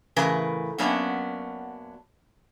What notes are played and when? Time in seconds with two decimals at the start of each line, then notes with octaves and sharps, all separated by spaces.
0.16 A2 C#3 E3 A#4 B4 G#5
0.78 F#2 F#3 A#3 B3 C#4 D4